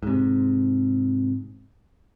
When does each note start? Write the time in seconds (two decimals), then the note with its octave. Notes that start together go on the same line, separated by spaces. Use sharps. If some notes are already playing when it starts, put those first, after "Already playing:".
0.03 G#2 C3